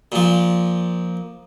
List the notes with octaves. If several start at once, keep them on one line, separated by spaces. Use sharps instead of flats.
A#2 F3